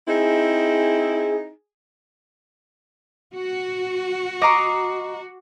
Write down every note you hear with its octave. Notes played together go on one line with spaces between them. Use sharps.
C4 D#4 E4 G#4
F#4
D#5 A#5 C#6 D6 C7